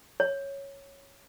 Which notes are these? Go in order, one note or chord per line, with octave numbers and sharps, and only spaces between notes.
C#5